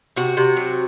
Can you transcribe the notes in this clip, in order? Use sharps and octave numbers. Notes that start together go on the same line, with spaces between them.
C3 F#4
C3
F#3